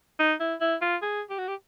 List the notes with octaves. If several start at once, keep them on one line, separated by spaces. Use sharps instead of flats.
D#4
E4
E4
F4
G#4
G4
F#4
G4